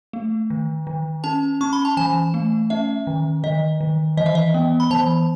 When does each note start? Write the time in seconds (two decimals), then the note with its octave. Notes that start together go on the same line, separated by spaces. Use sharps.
0.13 A3
0.50 D#3
0.87 D#3
1.24 C#4 A5
1.61 C#4 C#6
1.73 B5
1.85 A5
1.97 E3 G#5
2.34 A3
2.70 C#4 E5
3.07 D#3
3.44 D#3 D#5
3.81 D#3
4.17 E3 D#5
4.26 E5
4.35 D#5
4.54 B3
4.80 B5
4.90 E3 A5